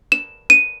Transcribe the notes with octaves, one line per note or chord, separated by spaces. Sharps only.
E7
D#7